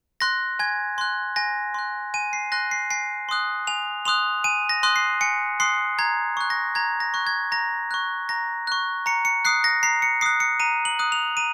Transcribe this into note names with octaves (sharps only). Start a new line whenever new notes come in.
C6 F#6 A#6
G#5 G#6
C6 F#6
G#5 A#6
C6 F#6
G#5 D#7
C7
C6 F#6 A#6
C7
G#5 C7
C6 D#6 F#6
G#5 F7
C6 D#6 F#6 F7
G#5 D#7
A#6
C6 D#6 F#6
C7
G#5 C#7
C6 D#6 F#6 C7
A#5 G#6
C#6 F#6
A#6
A#5 G#6
A#6
C#6 F#6
G#6
A#5 A#6
C#6 F#6
A#5 A#6
C#6 F#6
A#5 C#7
C#7
D#6 F#6 C7
A#6
A#5 C7
C#7
D#6 F#6 C7
C#7
A#5 D#7
F#7
D#6 F#6
F7
A#5 D#7